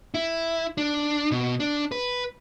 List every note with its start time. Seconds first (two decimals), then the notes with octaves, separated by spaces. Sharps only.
0.14 E4
0.78 D4
1.31 B2
1.60 D4
1.92 B4